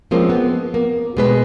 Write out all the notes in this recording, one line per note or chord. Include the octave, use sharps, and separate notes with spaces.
F3 G#3 A#3 C4 C#4
B3
A#3
B2 G#3 B4